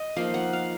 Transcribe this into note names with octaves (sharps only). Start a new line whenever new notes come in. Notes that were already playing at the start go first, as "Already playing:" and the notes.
Already playing: D#5
F3 A#3 D#4 F5
F#5
F5